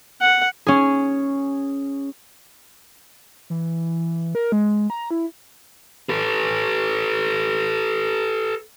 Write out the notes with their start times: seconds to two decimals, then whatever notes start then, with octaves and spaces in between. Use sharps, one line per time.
0.22 F#5
0.67 C#4 G#4
3.50 E3
4.35 A#4
4.52 G#3
4.90 A#5
5.11 E4
6.09 A4 B4